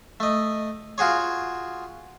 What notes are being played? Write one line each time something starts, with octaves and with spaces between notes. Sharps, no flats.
A3 D#5
F4 F#4 G#4 C#5